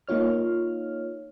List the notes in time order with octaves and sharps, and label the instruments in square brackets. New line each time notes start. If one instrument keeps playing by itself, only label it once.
[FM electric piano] A#3 D#4 F4 C#5 F6